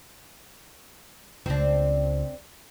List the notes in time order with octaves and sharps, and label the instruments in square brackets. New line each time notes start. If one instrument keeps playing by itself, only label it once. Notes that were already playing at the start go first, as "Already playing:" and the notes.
[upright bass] C#2 [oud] C4 D4